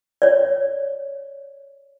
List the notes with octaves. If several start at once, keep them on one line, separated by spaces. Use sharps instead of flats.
C#5 D5